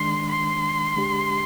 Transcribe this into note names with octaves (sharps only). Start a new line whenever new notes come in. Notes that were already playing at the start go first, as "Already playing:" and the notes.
Already playing: D#3 G#3 D4 C6
C6
D3 G#3 D4 G4